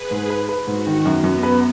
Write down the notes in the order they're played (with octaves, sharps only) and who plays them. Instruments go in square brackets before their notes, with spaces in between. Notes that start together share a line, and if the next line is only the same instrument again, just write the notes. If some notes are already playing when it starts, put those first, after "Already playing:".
Already playing: [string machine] G#4 B4
[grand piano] G#2
B4
B4
[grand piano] G#2 [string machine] F#4
[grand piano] D#3
[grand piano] F#2 [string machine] B3
[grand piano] F#2
B4